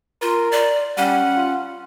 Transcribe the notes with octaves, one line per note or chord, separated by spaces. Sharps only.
F4 A#4
D5
G3 C#4 F#5
F4